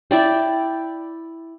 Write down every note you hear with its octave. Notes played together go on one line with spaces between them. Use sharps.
E4 D5 G5